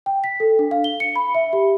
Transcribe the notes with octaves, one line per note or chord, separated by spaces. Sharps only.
G5
B6
A4
D4
F5
G7
C#7
B5
E5
G4